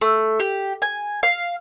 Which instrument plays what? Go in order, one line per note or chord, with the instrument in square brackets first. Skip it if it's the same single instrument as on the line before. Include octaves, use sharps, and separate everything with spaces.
[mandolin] A3
G4
G#5
F5